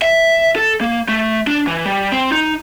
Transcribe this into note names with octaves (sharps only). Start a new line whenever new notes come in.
E5
A4
A#3
A3
D4
E3
G3
C4
D#4